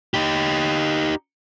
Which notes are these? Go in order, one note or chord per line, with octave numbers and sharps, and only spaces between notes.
D#4 G4